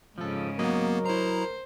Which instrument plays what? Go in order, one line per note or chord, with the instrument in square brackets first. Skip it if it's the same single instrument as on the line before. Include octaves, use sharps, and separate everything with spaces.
[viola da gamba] G#2 C#3 [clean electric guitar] F3 A4
[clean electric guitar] F#3 C#5 D#5 [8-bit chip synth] A#3 B3 [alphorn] A#4
[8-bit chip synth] E4 A#5 [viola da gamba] C5